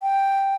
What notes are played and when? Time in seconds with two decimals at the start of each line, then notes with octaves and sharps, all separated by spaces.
0.02 G5